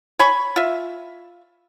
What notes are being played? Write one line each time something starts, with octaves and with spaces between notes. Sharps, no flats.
C#5 G#5 B5 C#6
F4 E5